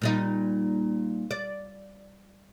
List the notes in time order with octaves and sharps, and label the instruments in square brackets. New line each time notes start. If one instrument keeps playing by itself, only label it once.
[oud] A#2 G3 D#4
D5